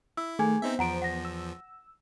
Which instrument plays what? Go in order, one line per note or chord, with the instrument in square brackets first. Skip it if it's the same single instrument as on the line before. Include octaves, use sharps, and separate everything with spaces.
[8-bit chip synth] E4 [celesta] E6
[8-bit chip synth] D#3 [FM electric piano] A3 [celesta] G#4 G#5 G#6
[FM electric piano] B3 C5 [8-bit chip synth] C4 D#4 E5
[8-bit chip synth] E2 F3 [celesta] F#5 A#5 D7
[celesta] F#5 A#6
[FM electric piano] E6